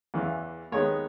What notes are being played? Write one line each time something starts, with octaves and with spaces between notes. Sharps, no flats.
E2 C#3 E3
D#2 D#3 G#3 B3 C#5